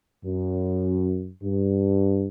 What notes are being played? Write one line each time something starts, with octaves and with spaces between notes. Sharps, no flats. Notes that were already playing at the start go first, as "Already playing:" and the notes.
F#2
G2